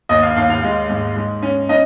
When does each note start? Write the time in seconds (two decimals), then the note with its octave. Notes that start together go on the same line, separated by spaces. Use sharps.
0.09 D#2 D#5 D#6
0.23 F5 F6
0.36 D#2 F5 F6
0.50 F5 F6
0.63 G#3
0.89 G#2
1.16 G#3
1.42 C#4
1.69 C#4 D#5 D#6